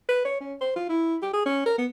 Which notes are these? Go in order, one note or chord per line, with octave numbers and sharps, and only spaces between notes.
B4
C#5
C#4
C5
F4
E4
G4
G#4
C#4
A#4
B3